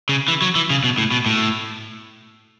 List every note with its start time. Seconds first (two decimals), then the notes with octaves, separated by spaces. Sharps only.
0.09 C#3
0.28 E3
0.42 F#3
0.55 E3
0.70 C#3
0.84 B2
0.98 A2
1.11 B2
1.26 A2